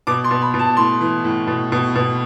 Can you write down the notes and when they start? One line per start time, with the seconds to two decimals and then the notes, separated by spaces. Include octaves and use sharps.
0.07 B2 D6
0.24 C6
0.31 B2
0.42 B5
0.54 B2
0.59 A5
0.77 A2 C6
1.01 E3
1.24 A2
1.47 B2
1.72 B2
1.95 B2